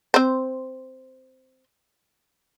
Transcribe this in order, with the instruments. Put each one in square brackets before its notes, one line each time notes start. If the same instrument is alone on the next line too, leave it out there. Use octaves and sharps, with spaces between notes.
[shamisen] C4 C5